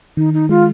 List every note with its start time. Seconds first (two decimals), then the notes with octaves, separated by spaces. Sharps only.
0.17 D#3 D#4
0.33 D#4
0.49 G#3 F4